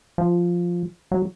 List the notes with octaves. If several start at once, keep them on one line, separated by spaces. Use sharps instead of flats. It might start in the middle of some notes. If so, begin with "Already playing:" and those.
F3
F#3